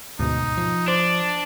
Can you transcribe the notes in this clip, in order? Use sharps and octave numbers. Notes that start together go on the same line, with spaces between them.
D2 G#2 B2 D#4
F3
D4 C5 D5